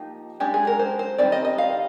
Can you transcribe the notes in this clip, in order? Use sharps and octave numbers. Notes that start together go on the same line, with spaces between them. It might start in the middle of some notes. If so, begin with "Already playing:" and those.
Already playing: F3 A#3 D#4 G4
G#3 D4 G4
G#4
A#4
C5
C5
D#3 G3 C4 D5
D#5
D#5
F5